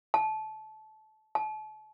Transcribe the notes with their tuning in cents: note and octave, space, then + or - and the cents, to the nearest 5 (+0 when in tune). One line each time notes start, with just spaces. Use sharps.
A5 -20
A5 -35